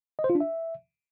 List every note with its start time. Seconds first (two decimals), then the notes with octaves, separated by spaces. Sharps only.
0.19 D#5
0.24 C5
0.30 F4
0.35 D4
0.41 E5